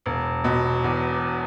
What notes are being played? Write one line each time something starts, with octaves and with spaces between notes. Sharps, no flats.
E1
B2
E2